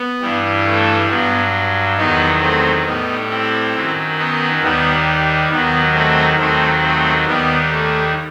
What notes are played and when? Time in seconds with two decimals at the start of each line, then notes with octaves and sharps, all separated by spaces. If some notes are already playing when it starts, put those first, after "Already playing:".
Already playing: B3
0.21 G2 E3 G3
0.65 A3
1.09 G2 F#3 B3
1.97 E2 D#3 F#3 B3 D#4
2.41 A3 C4
2.85 A2 G3 B3 D#4
3.30 C4 E4
3.74 F#2 D#3 F#3
4.18 B3 D#4
4.62 D#2 D#3 G3 B3
5.50 D#2 D#3 F#3 B3
5.94 A3 C4
6.39 D#2 D#3 F#3 A3 C4
6.82 A3 C4
7.27 D#2 D#3 G3 B3
7.71 A3